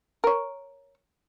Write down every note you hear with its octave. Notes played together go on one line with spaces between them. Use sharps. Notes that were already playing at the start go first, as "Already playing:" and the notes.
A#4 C#5